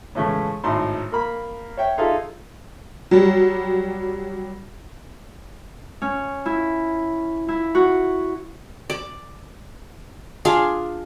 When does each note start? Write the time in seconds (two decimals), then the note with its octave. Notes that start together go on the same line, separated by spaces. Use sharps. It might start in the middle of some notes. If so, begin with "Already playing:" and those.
0.15 A2 C#3 E3 G#3 A3 C#4
0.64 G#1 A2 D#4 C6
1.12 A#3 B5
1.77 C#5 E5 G5
1.98 D#4 F4 G#4 A4 E5 F5
3.11 F#3 G3
6.02 C#4
6.46 E4
7.48 E4
7.75 F#4
8.90 D5
10.45 D4 F4 G#4 F5